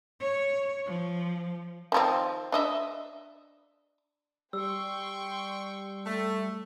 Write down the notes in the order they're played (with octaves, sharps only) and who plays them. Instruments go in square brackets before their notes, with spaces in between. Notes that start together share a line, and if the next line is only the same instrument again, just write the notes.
[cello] C#5
F3
[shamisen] D#3 F3 C4
D4 D#5 E5
[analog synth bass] G3 [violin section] G5 C6 C#6 [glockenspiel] E6
[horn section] A3